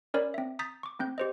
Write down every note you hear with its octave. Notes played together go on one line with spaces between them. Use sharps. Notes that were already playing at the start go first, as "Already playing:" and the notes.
C#4 A#4 C#5 D5 B5
C4 E5
A#5 D#6 G6 A6 B6
C#6 D6
A3 C4 G6
G4 C5 D#5